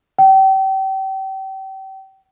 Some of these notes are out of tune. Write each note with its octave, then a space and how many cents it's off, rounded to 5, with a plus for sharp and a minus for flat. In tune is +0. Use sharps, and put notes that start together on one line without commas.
G5 -35